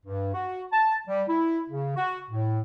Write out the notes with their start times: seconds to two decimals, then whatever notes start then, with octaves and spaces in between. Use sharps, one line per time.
0.06 G2
0.34 F#4
0.72 A5
1.07 G3
1.28 E4
1.69 C#3
1.96 F#4
2.30 A2